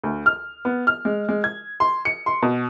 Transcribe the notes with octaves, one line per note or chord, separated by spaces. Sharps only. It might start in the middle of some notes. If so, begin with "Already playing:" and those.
D2
F6
B3
F6
G#3
G#3
G#6
C6
C#7
C6
B2